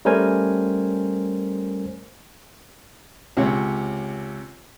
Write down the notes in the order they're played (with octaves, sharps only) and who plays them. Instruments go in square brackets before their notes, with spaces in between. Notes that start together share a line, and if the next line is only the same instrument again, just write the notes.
[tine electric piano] G3 A3 C#4 A#4 C5 G#5
[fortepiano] C#2 C3 C#5